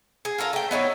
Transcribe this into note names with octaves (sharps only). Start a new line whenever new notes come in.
G#4
F4 A4 A#4 F5
A3 G5
B3 D#4 E4 C#5